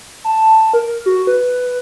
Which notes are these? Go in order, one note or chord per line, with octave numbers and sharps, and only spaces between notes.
A5
A#4
F#4
B4